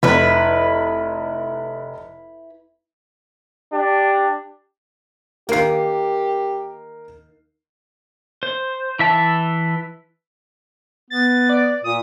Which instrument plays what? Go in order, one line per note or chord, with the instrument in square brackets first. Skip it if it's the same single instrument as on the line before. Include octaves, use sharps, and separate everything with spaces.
[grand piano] F1 [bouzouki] E4 B4
[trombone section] D4 G4
[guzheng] D#3 A#3 [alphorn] G4 [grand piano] A#4 C7
[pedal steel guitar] C5
E3 E5 A5
[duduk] B3 [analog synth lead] A6
[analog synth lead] D5
[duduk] A#2 [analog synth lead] D#6